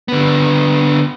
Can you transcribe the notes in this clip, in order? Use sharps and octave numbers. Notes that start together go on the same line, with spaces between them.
D3 B3